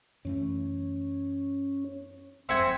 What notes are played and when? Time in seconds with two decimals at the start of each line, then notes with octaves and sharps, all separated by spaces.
0.25 F#2 E3 A3 C#4
2.49 F#1 F2 G#3 C4 E5 F#5 G#5